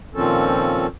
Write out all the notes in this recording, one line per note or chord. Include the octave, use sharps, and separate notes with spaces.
A#2 D#3 F3 C4 C#4 A4